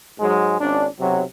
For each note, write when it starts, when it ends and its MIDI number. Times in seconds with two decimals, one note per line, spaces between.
0.20 0.57 44
0.20 0.57 54
0.20 0.57 56
0.60 0.86 32
0.60 0.86 61
0.60 0.86 62
0.99 1.22 35
0.99 1.22 48
0.99 1.22 54